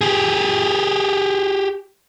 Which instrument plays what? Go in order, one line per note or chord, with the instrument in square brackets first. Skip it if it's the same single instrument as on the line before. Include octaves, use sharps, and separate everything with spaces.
[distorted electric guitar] G4 G#4